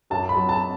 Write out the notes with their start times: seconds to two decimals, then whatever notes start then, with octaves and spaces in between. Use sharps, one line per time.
0.10 F#2 A5
0.29 B5
0.35 F#3
0.49 A5